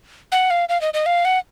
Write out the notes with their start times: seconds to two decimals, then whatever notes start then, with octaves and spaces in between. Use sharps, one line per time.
0.32 F#5
0.50 F5
0.69 F5
0.81 D#5
0.94 D#5
1.06 F5
1.25 F#5